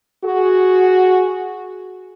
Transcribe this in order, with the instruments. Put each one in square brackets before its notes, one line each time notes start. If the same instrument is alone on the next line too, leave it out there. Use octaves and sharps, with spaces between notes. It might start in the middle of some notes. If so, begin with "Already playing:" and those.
[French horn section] F#4 G#4